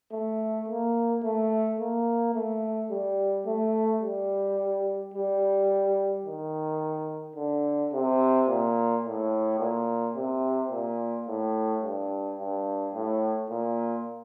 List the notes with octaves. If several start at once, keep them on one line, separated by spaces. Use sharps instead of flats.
A3
A#3
A3
A#3
A3
G3
A3
G3
G3
D#3
D3
C3
A#2
A2
A#2
C3
A#2
A2
G2
G2
A2
A#2